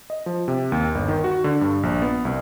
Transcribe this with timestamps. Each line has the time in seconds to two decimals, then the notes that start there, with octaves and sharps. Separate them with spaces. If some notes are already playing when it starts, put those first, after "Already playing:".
0.10 D#5
0.26 F3
0.48 C3
0.72 D#2
0.95 G1
1.08 D#3
1.24 F#4
1.44 D3
1.61 G2
1.83 A#1
2.02 B3
2.25 C2